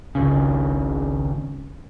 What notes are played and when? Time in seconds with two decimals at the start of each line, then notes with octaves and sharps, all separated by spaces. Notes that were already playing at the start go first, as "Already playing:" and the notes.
0.15 G#1 C#2 C#3